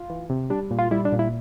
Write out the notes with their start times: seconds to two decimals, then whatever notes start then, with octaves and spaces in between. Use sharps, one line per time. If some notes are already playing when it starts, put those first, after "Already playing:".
Already playing: F4
0.10 E3
0.30 C3
0.50 G3 D4
0.71 A#2
0.79 F4
0.91 G3 E4
1.05 D4
1.12 A#2
1.19 E4